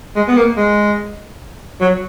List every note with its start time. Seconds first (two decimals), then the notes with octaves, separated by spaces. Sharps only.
0.16 G#3
0.28 B3
0.37 A#3
0.57 G#3
1.81 F#3